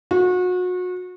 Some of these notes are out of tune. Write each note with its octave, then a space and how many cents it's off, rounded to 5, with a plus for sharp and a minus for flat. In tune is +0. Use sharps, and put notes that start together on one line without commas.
F#4 -35